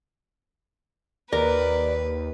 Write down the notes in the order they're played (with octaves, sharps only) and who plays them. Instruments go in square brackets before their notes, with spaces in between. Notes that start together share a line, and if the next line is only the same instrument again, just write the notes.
[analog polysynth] D#2 [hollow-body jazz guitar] A#4 [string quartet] B4 [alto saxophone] D5